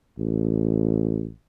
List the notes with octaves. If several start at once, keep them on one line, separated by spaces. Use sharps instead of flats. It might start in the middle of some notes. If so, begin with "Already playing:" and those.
A1